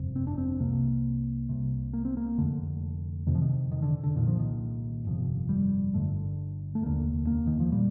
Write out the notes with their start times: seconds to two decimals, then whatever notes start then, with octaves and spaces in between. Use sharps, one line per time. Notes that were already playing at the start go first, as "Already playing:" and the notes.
Already playing: G1 F2 C3
0.16 C4
0.27 D4
0.38 C4
0.60 C2 C3 A#3
1.49 C2 C3
1.93 A#3
2.05 C4
2.17 A#3
2.38 F1 F2 D3 A3
3.27 F1 F2 C3 D#3
3.35 F3
3.42 D#3
3.72 D#3
3.82 D3
4.04 D3
4.16 C2 A#2 D#3
4.27 F3
4.39 D#3
5.05 G1 F2 C3
5.49 G3
5.94 G1 G2 D3 A3
6.75 A3
6.82 F1 D#2 D3 A#3
7.27 A#3
7.47 D#3
7.60 F3
7.72 A#2 G3